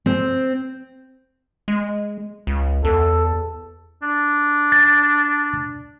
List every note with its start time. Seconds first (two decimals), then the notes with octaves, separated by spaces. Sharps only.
0.06 C4
1.68 G#3
2.47 C#2
2.85 E2 A4
4.02 D4
4.72 A6